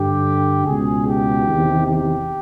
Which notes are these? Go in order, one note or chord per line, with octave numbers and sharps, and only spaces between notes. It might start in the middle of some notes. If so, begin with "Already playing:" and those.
Already playing: G2 D3 G4
C#2 B2 G#4
G4
E2 C3 D#3
G4